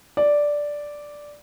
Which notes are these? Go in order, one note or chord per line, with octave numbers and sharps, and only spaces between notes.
D5